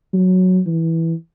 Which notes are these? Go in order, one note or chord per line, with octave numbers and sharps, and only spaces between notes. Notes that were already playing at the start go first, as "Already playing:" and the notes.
F#3
E3